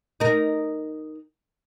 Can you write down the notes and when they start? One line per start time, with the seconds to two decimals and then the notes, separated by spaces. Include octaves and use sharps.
0.20 D#4 A#4